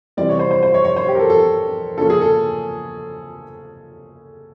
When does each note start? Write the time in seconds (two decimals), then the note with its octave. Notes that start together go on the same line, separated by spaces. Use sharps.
0.17 C3 E3 G3 C4 D5
0.29 C#5
0.39 C5
0.51 C5
0.63 C5
0.74 C#5
0.84 C#5
0.96 C5
1.08 G4
1.15 A#4
1.19 A4
1.30 A4
1.98 C#3 F3 A#3 C#4 A4
2.10 G#4
2.21 A4